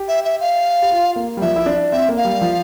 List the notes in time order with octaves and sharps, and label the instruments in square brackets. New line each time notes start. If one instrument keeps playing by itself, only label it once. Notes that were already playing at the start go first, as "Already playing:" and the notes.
Already playing: [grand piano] G4
[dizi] E5
E5
F5
[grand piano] G4
F4
A#3
G3
[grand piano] F3 [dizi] E5
[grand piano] E4
D4
[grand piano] C4 [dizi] E5
[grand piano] A#3
[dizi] F5
[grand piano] G3
F3